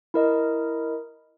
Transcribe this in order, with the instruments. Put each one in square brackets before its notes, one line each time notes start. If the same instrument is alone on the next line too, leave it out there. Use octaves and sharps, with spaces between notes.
[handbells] E4 A#4 D#5